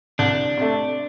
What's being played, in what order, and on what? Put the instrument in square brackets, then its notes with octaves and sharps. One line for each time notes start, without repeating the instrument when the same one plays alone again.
[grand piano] C2 [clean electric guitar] D4
[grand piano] C3 A3